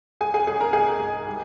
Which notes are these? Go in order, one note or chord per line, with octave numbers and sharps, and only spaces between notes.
C2 G#4 G#5
G#4 G#5
C2 G#4 G#5
A#4 A#5
G#2 G#4 G#5
G#2
G3